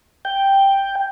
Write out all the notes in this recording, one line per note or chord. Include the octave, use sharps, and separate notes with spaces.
G5